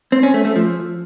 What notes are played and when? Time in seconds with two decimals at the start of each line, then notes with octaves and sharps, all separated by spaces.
0.12 C4
0.23 C#4
0.34 A3
0.45 A3
0.56 F3